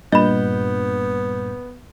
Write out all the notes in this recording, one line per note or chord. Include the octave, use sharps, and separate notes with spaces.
G2 A#2 B3 D#5 B5 G6